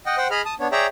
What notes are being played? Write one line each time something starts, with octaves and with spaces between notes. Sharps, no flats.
D#5 F#5 G5
C5 F#5 G5
G#4 D#5 B5 F6
A5 D#6
B3 D4 C#5
G#4 C#5 D5 E5 G5 A#5